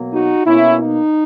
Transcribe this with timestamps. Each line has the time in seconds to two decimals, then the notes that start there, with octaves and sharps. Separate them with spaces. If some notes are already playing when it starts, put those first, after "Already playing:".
Already playing: B2 F#3 A#3
0.13 D#4 F#4
0.46 B2 A#3 C#4 E4
0.80 D#4